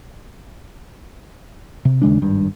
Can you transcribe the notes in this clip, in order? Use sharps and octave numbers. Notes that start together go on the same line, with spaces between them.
C3
D#2 C#3 G#3 D4
G#1 G2